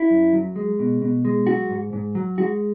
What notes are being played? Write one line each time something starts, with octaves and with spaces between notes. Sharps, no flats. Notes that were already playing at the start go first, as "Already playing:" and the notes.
Already playing: E4
F#2
F#3
G#3
B2
B2
G#3
F#3 F#4
G#2
G#2
F#3
G#3 F#4